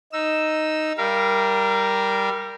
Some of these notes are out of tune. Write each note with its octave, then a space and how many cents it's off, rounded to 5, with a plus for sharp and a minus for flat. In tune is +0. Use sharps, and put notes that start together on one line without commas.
D#4 +0 E6 +0
G3 -5 A#4 +0 F5 -35